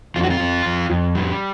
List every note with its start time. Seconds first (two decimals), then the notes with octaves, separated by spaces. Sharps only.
0.16 F2 F4
0.23 F#4
0.30 F4
0.40 F2
0.65 F2
0.90 F2
1.15 G3